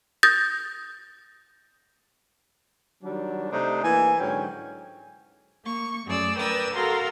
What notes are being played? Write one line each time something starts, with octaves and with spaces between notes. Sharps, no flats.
D#6 G6 A6 A#6
D#3 F#3 G3 D4
C3 A3 D4 D#4 C5
E3 A#3 G#5
G#2 D3 F#3 C#4 G5
A#3 C#6
F#2 A3 G#4 D5 E6
A#4 B4 D5 G5 D#6 E6
F#4 A4 A#4 F5 A#5 C6